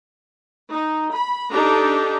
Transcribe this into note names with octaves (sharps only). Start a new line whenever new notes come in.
D#4
B5
D4 D#4 G4 A4 A#5